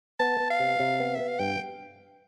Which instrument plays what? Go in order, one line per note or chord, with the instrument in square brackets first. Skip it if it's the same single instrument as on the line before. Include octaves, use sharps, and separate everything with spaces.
[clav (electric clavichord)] B3 [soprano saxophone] A5
[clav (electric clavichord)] B3
[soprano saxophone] F5
[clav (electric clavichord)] C3
C3
B3
[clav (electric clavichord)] B3 [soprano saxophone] E5
[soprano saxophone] F5
[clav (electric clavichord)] G2 [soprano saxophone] G5